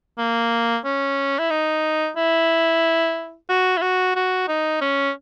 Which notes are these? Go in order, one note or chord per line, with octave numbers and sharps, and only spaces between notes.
A#3
C#4
E4
D#4
E4
F#4
E4
F#4
F#4
D#4
C#4